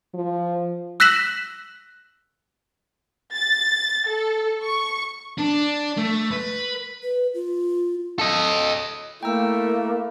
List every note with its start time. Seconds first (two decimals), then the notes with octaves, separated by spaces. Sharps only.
0.14 F3
1.00 E6 F#6 A#6 B6 E7 F#7
3.34 A6
4.08 A4
4.64 C#6
5.38 D4
5.97 A3
6.31 B4
7.02 B4
7.34 F4
8.19 A4 D#5
9.23 A3 A#3 E4 G5 A#5 E6